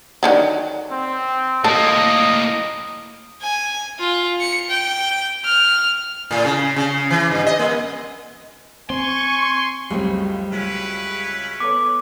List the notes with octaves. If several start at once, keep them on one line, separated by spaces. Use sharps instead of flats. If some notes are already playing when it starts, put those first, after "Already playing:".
D3 D#3 F#3
C4
A2 A#3 A4 D#5
G#5
F4
C#7
G5
F6
A2
C#3
C#3
E3
G2
D#5
A#3
C4 G#5 C6 C#6
C#2 F#2 F#3 G3 A3 C4
C#2 F#3 C#4 E4 B4
B3 A4 C#5 D6